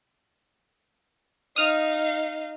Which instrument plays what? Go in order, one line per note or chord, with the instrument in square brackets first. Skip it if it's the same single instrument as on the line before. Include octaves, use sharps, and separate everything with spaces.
[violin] D#4 F5 [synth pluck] D#6 F6